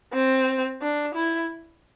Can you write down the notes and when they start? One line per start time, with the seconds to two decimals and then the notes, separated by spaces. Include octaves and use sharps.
0.13 C4
0.81 D4
1.15 E4